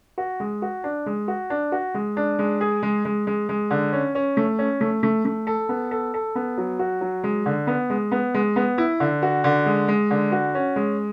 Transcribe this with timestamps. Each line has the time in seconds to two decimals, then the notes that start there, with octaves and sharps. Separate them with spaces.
0.18 F#4
0.40 G#3
0.62 F#4
0.84 D4
1.06 G#3
1.28 F#4
1.50 D4
1.72 F#4
1.94 G#3
2.17 D4
2.39 G#3
2.61 G#4
2.83 G#3
3.05 G#3
3.27 G#3
3.49 G#3
3.71 D3
3.93 C#4
4.15 C#4
4.37 A3
4.59 C#4
4.81 A3
5.03 A3
5.25 A3
5.47 A4
5.69 B3
5.91 A4
6.14 A4
6.35 B3
6.58 F#3
6.79 F#4
7.01 F#3
7.24 G#3
7.46 D3
7.67 B3
7.90 G#3
8.11 B3
8.34 G#3
8.56 B3
8.78 E4
9.00 D3
9.22 F#4
9.44 D3
9.66 G#3
9.88 G#3
10.11 D3
10.32 F#4
10.55 C#4
10.76 G#3